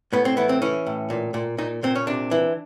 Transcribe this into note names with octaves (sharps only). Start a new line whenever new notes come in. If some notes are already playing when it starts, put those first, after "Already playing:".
A2 B3
C4
E3 B3
C4
E3 C#4
A2
A#2
A#2
A#2 D#4
A#2 C4
C#4
C3 D4
E3